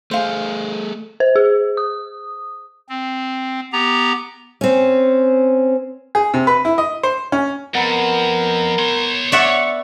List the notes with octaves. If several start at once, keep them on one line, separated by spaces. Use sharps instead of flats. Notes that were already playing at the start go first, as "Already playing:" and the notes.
A3 G#4 C5 F5
C5
G#4
D#6
C4
B3 G4 A#5
C4 C#4
G#4
C3
B4
E4
D#5
C5
C#4
F2 B3 A#4
C#5 C6
D5 E5 F#5 C#6